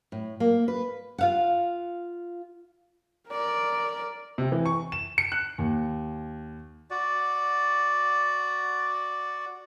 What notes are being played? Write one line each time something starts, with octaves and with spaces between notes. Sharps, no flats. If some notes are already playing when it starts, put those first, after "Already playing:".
A2
A#3
B4
F4 F5 F#5
A#4 D5
C3
E3
C#6
E7
C#7
F#6
D#2
F#4 D5